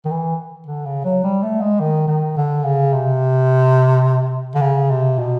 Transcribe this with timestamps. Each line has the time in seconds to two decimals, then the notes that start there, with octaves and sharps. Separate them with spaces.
0.05 D#3
0.10 E3
0.67 D3
0.86 C#3
1.04 F#3
1.23 G3
1.42 A3
1.61 G#3
1.80 D#3
2.07 D#3
2.37 D3
2.64 C#3
2.93 C3
4.55 D3
4.61 C#3
4.90 C3
5.18 B2